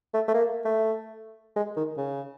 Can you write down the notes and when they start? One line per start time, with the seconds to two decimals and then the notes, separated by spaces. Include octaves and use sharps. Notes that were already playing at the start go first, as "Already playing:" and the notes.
0.14 A3
0.28 A3
0.34 A#3
0.65 A3
1.56 G#3
1.77 D#3
1.97 C#3